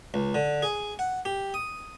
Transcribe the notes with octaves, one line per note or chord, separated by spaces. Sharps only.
C#2
D3
G#4
F#5
G4
D#6